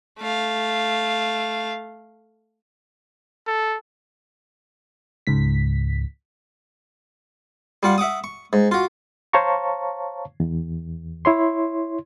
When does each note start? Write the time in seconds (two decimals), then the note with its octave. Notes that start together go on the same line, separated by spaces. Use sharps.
0.19 A3 F5
3.47 A4
5.27 C#2 G#2 B6
7.83 G3 F4 F#5
7.98 E5 F#5 D6 D#6
8.24 C#6
8.53 G#2
8.71 F4 F#4
9.33 C5 C#5 F5 A5 A#5 C#6
10.40 E2
11.25 E4 C#5 C6